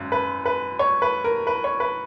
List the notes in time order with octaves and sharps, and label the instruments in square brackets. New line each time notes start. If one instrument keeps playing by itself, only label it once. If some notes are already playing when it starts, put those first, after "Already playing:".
Already playing: [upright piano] G#1 F#2
B4
B4
C#5
B4
A#4
B4
C#5
B4